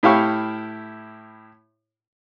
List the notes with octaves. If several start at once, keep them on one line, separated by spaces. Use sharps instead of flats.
A2 E4 G4 F5 C#6 F6